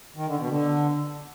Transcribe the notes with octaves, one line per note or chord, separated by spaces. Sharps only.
D#3
D3
B2
D3